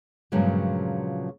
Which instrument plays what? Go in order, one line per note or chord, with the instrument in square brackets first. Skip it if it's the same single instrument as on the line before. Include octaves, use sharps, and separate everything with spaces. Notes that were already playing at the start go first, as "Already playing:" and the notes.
[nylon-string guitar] G2 A#2 C#3 F3 F#3 G#3